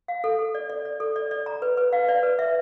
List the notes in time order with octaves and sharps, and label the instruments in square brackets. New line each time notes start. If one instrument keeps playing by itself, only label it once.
[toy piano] F5
A4
A4
D5
D5
D5
A4
D5
D5
A#5
B4
B4
F5
D5
B4
E5